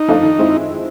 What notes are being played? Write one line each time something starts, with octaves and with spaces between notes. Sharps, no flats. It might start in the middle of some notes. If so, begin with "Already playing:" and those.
Already playing: D#4
F3 A3 D4 F4
D#3
G#3 C4 E4